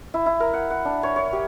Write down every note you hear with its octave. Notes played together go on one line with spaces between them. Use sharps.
E4
E4
A#4
F#5
F#5
D4
C#5
C#5
G4